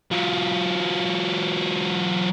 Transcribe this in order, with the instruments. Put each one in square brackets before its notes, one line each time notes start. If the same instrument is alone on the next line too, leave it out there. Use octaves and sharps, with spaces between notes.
[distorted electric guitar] F#3 F4